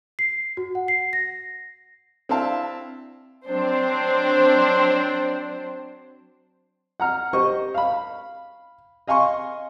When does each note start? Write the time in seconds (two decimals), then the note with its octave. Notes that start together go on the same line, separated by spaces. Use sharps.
0.19 C7
0.57 F#4
0.75 F#5
0.88 C7
1.13 A#6
2.29 C4 D4 E4 F5 A5
3.48 F#3 C4 D4 C5
7.00 F#5 A#5 F6
7.33 G4 C5 D#5 C#6
7.74 F5 B5
9.08 D#5 F5 G#5 C6 C#6